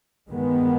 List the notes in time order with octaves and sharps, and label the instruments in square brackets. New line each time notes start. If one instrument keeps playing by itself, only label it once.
[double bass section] G2 D#3 G#3 B3